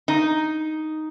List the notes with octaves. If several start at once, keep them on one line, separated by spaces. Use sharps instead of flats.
D#4